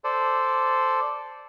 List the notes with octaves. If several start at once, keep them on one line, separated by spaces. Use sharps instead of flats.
A4 C5 D5